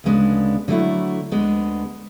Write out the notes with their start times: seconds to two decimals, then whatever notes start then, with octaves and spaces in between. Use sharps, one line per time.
0.04 D2 C#3 G#3 B3 D4
0.68 D3 F#3 A3 E4
1.31 D2 D3 G#3 B3